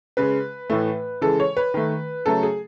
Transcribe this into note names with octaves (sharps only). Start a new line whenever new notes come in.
C#3 G#3 B4
A2 E3 A3
C#3 E3 G#3 A4
C#5
B4
D#3 A3
C#3 F#3 A3 A4
G#4